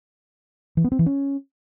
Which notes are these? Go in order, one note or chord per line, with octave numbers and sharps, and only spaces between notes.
E3
B3
C4
E3
C#4